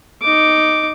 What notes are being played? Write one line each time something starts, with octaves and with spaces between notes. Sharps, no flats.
D#4 D6